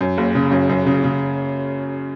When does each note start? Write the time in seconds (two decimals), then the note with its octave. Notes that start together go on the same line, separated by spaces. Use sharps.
0.01 F#2
0.18 F#1
0.35 C#3
0.52 F#2
0.69 F#2
0.86 C#3
1.04 C#3